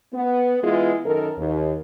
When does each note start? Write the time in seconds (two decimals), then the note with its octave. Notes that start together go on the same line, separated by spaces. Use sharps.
0.14 B3
0.64 E3 G#3 B3 E4 F4 G#4
1.06 F#2 D#3 A4 A#4
1.38 D#2